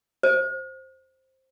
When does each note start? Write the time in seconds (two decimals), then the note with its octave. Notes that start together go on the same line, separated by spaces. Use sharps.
0.23 C5